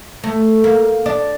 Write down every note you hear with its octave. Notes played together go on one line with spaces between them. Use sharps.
A3
A#3
D4